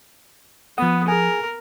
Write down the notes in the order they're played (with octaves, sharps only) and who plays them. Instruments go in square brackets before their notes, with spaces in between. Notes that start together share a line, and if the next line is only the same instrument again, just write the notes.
[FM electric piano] F3 D#6 [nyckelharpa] B3 [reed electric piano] F#5
[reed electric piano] G#4 G#5 [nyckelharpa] A#4